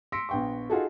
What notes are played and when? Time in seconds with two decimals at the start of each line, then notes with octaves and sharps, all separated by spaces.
0.12 C6 E6 A#6 B6 C#7 D7
0.29 A#1 B3 G5 C6 C#6
0.70 D#4 F4 F#4 G#4 A4